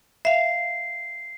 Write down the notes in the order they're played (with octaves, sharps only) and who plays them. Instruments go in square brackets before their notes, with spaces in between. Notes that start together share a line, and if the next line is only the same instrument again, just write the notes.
[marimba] E5 F5 [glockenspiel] C7